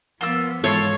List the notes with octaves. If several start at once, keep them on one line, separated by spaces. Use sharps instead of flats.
F3 A#3 B3 F4 E6
G#2 E3 E4 F4 A4 C#5 C#6